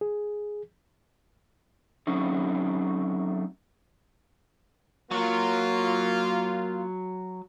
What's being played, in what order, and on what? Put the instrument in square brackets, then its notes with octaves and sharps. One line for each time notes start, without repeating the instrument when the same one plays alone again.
[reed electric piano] G#4
[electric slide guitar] F#3 A3 C4 C#4 D#4
[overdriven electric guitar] F#3 [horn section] A#3 F4